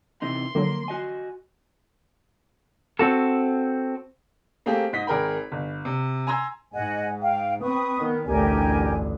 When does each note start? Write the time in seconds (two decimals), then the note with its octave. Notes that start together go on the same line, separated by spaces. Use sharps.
0.22 C3 E3 D#4 C6
0.55 D3 F3 F#3 A#3
0.88 F#4 D#5 G#5
2.99 C4 F#4 A4
4.66 A3 A#3 C4 G4 G#4
4.93 G#2 D#5 B6
5.07 G#1 G#4 A#4 G5 B5
5.52 G1
5.85 C3
6.27 G#5 A#5 C6 E6 G#6
6.73 G#2 D#5 F#5 G#5
7.22 F5 G5
7.61 C4 B4 C#6 D#6
7.97 D#3 B3
8.26 A1 D2 G2 G4 A#4 G#5